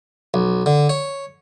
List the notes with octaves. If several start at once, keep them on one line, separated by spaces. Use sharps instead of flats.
B1
D3
C#5